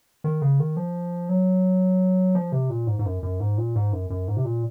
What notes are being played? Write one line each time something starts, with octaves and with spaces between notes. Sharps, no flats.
D#3
C#3
D#3
F3
F#3
F3
C3
A#2
G#2
G#2
F#2
F#2
G#2
A#2
G#2
F#2
F#2
G#2
C3
A#2